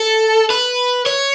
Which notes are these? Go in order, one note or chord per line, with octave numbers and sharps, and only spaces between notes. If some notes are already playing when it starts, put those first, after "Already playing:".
Already playing: A4
B4
C#5